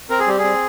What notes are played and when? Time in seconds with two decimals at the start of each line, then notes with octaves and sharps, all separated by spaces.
0.10 C4 A#4
0.20 G#4
0.27 G3 G4
0.39 G#4
0.44 C4